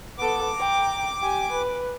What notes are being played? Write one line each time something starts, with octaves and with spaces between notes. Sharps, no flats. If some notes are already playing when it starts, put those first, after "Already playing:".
B3 A4 D6
G5 A#5
G4 G#5
B4